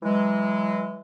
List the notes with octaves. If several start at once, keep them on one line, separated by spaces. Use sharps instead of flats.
E3 F#3 G#3